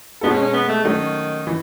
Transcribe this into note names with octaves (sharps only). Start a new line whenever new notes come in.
B2 G#3 B3 D#4 A4
C#4
C#4
B3
A3
D#3 F#3 A3 C#4
E3